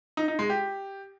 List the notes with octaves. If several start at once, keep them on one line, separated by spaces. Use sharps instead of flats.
D#4
D#4
G#3
G4